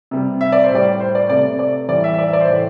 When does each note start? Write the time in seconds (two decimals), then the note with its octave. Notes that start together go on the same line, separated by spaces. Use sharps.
0.11 C3 G3
0.41 E5
0.52 D5
0.64 C5
0.70 A2 G3 D5
1.00 C5
1.15 D5
1.29 C3 A3 D5
1.59 D5
1.89 A2 E3 G3 D5
2.04 E5
2.14 E5
2.18 D5
2.28 E5
2.33 D5
2.41 C5
2.48 A2 E3 A3 D5